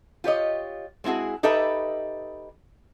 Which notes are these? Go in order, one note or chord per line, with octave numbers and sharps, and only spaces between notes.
F4 G4 C#5 D#5
G#3 C4 E4 F#4 G#4
D#4 G4 A4 B4 D#5 E5